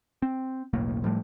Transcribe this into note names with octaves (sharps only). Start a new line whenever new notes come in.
C4
E1 B1 A2 A#3
A2 F3 G3 A3